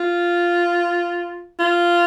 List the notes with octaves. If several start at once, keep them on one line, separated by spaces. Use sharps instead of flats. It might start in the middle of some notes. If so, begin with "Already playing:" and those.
Already playing: F4
F4